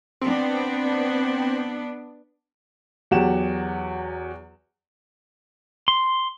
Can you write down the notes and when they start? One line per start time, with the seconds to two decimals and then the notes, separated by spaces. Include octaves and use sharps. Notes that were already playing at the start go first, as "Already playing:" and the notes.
0.21 B3 C4 D4
3.11 E2 F#3 G4 F#5 E7
5.88 C6